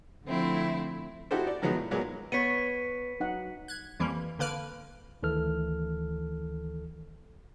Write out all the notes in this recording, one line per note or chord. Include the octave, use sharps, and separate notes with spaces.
D3 F3 A3 C4 E4
D#4 E4 F#4 G4 A4 C5
D5
D#3 F3 F#3 G#3 B3 D#4
A2
A#2 F#3 G#3 A#3 B3
B3 B4 C#5 B6 C#7 D#7
F#3 D#4 F#5
F#6 G#6
F2 E3 G3 A#3
D3 A#3 B4 F6 D7
D2 D#3 E3 A4 F6